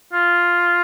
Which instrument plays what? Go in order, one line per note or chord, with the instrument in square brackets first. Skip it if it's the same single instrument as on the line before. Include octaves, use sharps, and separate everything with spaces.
[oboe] F4